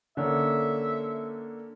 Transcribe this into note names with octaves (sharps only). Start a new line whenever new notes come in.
D3 A#3 C#4 E5